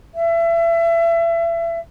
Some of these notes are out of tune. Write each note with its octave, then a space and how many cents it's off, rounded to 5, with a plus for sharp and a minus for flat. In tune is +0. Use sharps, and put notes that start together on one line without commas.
E5 +30